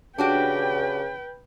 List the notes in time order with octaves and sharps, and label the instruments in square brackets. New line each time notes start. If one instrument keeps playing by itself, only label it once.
[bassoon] C#3 [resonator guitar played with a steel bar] D4 F#4 G4 [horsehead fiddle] B4 G5